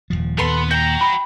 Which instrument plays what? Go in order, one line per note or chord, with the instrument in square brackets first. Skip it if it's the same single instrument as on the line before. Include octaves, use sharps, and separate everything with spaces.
[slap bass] D#1 C2 F3
[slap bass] D#2 A#2 [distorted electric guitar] B3 [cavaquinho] A4 B4 C6
[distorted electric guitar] F#4 A#5 [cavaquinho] G5
[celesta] B5